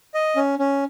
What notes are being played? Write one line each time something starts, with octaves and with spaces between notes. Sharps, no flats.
D#5
C#4
C#4